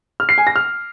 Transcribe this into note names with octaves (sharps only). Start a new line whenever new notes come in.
F6
C7
G#5
A#6
F6